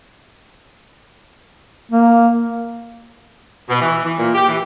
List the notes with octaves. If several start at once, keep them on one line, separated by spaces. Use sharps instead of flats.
A#3
B2
E3
E3
A#2
G4
E3